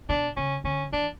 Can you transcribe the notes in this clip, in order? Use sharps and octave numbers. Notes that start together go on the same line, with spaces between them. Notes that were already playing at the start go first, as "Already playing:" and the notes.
B2 D4
C#3 C#4
D3 C#4
E3 D4